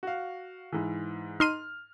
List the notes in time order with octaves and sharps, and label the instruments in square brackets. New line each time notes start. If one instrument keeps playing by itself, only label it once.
[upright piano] F#4 F5
G#2 E3
[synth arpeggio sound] D#4 C6 D#7 [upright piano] F6